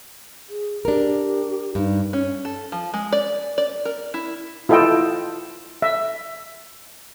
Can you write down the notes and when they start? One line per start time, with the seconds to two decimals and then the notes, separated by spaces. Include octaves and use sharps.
0.49 G#4
0.85 D4 G4 A#4
1.75 G2 D#4
2.13 C#4
2.45 A4
2.72 F3
2.94 G#3
3.12 D5
3.58 D5
3.85 A#4
4.14 E4
4.69 E4 F4 A4 D#5 G5
5.82 E5